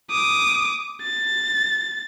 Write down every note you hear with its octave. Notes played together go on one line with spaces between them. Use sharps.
D6 D#6
A6